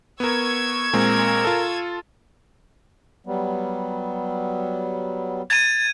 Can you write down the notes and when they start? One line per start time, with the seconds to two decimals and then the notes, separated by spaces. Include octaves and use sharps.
0.20 B3 A#4 C#6 E6 G#6
0.93 A#2 G#3 C4 A#4
1.45 F4 A4
3.27 F#3 G3 B3
5.50 G#6 A6 D#7